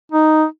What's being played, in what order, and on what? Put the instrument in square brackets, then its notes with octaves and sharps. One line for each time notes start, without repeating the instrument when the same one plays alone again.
[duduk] D#4